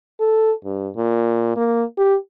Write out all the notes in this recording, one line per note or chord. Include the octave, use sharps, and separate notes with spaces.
A4
G2
A#2
A#3
G4